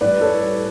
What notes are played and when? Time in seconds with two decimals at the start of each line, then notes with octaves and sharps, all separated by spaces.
0.01 A2 G3 B4 D5
0.21 A4 C#5